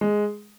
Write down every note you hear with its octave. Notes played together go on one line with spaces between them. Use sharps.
G#3